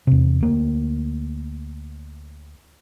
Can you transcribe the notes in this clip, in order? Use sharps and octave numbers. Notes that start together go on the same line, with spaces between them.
E2 C3
D2 A#3